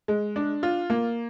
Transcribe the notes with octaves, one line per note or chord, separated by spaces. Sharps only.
G#3
D4
F4
A#3